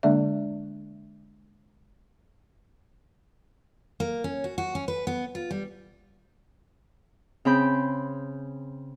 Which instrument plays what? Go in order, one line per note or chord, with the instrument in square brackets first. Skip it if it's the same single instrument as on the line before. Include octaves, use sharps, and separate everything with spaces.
[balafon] D3 G#3 A#3 D4 D5 E5
[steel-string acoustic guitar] A#3
C#4
F#4
F#4
C#4
B4
B3
F4
G3
[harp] C#3 C4 B5 G6